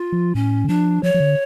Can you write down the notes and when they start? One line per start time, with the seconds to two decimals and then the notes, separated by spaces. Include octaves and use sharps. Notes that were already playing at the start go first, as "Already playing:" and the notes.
Already playing: F4
0.12 F3
0.35 A2 C#4
0.64 D3
0.68 F3 D4
1.03 F3 C#5
1.14 F3
1.20 D3